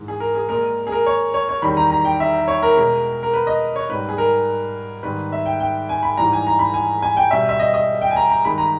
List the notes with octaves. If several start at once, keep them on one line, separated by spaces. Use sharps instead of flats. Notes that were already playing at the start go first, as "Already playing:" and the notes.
Already playing: G#2 E3 G#3
G#4
A#4
G#4
A#2 G#3 A#4
G#4
A#4
C#5
C#5
C#5
E2 D#3 G3 B5
A#5
A#5
G5
E5
C#5
A#4
B2 G#3
A#4
B4
D#5
C#5
G#2 G3 B4
G#4
A#4
G#2 D#3 G3 B4
E5
G5
G5
G#5
B5
G#2 E3 G3 A#5
G#5
A#5
B5
G#5
G#5
G5
B2 G3 E5
E5
D#5
D#5
G5
G#5
A#5
A#5
G2 D#3 G#3 B5
A#5